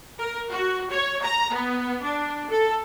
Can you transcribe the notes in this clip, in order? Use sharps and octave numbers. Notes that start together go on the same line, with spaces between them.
A#4
F#4
C#5
A#5
B3
D4
A4